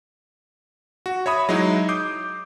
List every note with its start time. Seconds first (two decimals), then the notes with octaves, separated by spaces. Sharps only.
1.06 F#4
1.26 C#5 E5 B5 D#6
1.49 F#3 G#3 D#4 E4
1.89 D6 D#6 G6 C7